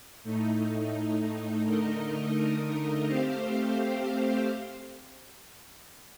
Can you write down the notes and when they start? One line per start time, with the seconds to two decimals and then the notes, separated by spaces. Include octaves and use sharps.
0.24 A2 A3 D#4
1.66 D3 A3 D#4 A#4 D#5
3.07 A3 C4 G4 C5 F5